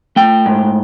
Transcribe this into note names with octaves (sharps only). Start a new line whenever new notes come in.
A3 G5
G#2